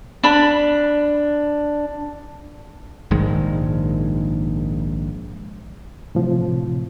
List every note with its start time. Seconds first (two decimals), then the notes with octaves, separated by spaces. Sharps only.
0.24 D4 B5
3.11 A#1 G#2 D#3 G#3
6.15 A2 C3 F3